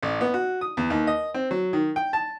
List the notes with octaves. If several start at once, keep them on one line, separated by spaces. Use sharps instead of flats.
A1
B3
F#4
D#6
E2
D#2
D#5
C4
F#3
D#3
G5
A5